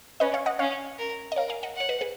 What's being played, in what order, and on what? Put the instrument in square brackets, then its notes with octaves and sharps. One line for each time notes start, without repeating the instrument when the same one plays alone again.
[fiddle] C#4 [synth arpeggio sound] B4 D#5
[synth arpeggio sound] C#5 F5
D#5 F#5
[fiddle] C#4 [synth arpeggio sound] C#5 F5
[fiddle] A#4
[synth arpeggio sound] D#5
[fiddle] A#4 [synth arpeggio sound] C#5 F5
[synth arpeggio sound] F5 G#5
D#5 F#5
[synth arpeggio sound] C#5 [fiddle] F#5
[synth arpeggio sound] B4 D#5
G#4 B4